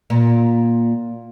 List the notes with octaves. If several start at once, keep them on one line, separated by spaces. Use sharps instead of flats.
A#2